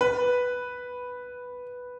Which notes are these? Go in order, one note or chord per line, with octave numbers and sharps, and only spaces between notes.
B4